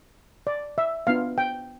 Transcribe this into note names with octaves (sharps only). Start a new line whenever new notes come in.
D5
E5
B3 D4 F4 F5
G5